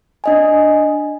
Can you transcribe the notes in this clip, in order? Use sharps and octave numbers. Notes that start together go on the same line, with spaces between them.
D4 D#5 G#5